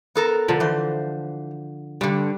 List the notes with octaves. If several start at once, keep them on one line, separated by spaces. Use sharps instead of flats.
B3 A4 A#4
D3 F3
E3 C5
G2 D3 G3